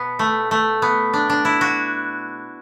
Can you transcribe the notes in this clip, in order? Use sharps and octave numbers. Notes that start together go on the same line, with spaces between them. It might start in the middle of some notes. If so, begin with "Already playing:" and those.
Already playing: B2 B3
A3
A3
B3
D4
D4
E4
F#4